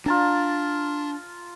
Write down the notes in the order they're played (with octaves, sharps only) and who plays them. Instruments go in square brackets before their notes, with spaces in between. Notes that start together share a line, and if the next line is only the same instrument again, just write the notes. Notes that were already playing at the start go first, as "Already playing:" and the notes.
[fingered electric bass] D4 [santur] F4 A5 A#5